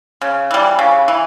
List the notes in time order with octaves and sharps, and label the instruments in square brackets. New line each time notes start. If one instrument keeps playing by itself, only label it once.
[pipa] C#3
E3 G3
C#3
E3